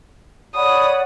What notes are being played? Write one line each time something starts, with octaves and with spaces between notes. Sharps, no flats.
C#5 D5 F#5 B5 D#6